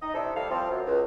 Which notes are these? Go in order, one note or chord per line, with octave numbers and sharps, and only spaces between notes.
D#4 D#5
C3 D4 E4 A4
G3 A3 A4 F5
F3 G3 C4 F4
F#2
C#2